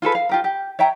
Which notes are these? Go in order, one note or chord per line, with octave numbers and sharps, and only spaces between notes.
F4 G#4 A4 B4
F5
F4 G4 A#4
G4
C#5 E5 G5 A#5